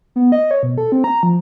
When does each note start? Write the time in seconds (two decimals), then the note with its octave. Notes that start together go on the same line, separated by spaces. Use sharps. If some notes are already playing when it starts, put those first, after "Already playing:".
0.16 B3
0.32 D#5
0.51 C#5
0.63 B2
0.78 A4
0.92 C4
1.04 A#5
1.23 F3